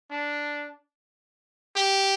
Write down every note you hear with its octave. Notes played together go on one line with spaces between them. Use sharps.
D4
G4